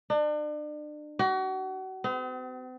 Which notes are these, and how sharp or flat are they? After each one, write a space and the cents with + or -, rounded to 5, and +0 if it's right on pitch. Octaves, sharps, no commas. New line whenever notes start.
D4 +35
F#4 +35
C4 -45